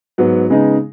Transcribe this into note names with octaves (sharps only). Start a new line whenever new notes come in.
G#2 F#3 B3
C#3 G#3 B3 D#4